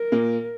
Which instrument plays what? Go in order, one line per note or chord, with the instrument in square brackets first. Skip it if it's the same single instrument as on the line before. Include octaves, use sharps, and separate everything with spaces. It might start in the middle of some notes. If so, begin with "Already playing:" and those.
Already playing: [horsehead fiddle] A#4
[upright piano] A#2 A#3